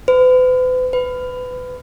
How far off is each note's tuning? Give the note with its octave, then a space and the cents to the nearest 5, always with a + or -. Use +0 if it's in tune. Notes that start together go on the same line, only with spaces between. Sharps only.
B4 +45
B4 +25